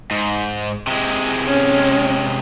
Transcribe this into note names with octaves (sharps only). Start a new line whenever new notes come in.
G#2
C3 G#3
C#4